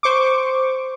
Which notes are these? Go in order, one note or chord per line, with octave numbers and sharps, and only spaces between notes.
C5 C#6 D6